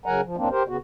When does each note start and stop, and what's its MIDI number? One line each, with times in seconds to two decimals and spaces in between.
0.06 0.21 49
0.06 0.21 54
0.06 0.21 70
0.06 0.21 78
0.06 0.21 80
0.06 0.21 82
0.24 0.36 53
0.37 0.49 42
0.37 0.49 45
0.37 0.49 58
0.37 0.49 60
0.37 0.49 62
0.51 0.63 67
0.51 0.63 70
0.51 0.63 72
0.68 0.77 49
0.68 0.77 59
0.68 0.77 66